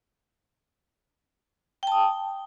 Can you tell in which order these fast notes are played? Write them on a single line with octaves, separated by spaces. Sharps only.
G5 A5 D#6